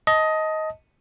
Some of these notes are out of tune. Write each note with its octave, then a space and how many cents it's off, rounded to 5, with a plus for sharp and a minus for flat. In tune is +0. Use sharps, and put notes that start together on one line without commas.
D#5 +15 A5 +0